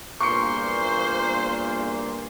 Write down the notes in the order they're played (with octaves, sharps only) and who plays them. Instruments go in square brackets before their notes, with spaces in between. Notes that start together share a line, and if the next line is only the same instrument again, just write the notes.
[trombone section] E2 G2 A#2 [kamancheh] C5 [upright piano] C#6 C#7